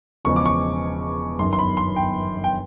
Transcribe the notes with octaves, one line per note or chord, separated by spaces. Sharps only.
E1 E2 C#3 F3 G#3 C#6
D6
C#6
G1 F#2 D#3 C6
C6
B5
C6
G5
G5